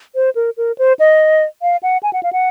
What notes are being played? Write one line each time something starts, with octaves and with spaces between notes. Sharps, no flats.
C5
A#4
A#4
C5
D#5
F5
F#5
G#5
F#5
F5
F#5